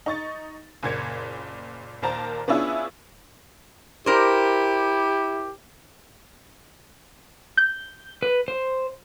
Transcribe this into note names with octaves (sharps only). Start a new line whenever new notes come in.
D#4 C#6 A6
F#1 A#2 G#6 C#7
D#2 A#2 A#4 C5 A5 A#5
B3 C#4 D4 E4 F4 G#4
E4 G4 A#4 C5
G6
B4
C5